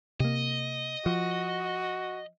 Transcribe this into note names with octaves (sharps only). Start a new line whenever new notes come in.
C3 A#3 D#5
F3 F#4